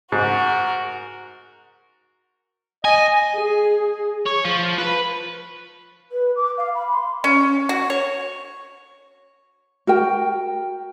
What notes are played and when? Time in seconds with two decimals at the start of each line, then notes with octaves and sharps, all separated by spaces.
0.12 G#2 F#4 A#4
2.85 D#5 G#5
3.35 G#4
4.26 C#5
4.45 F3
4.79 B4
6.11 B4
6.35 D6
6.57 F5
6.74 B5
6.92 C6
7.24 C#4
7.69 F#4
7.90 C#5
9.87 F#4 A#4 G5